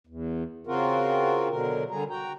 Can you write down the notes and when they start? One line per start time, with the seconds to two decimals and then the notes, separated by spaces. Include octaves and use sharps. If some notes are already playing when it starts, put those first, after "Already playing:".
0.07 E2
0.67 C#3 C4 F4 F#4 A#4
1.49 B2 D3 F#3 A#4
1.91 D3 G3 G#4 A#5
2.10 F#4 G5 A#5